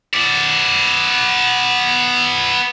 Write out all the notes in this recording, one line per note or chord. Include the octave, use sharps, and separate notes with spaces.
B3 D5